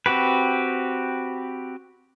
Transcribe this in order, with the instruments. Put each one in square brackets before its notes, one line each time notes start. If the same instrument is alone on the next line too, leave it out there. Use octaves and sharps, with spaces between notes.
[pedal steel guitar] C4 F#4 G4 B4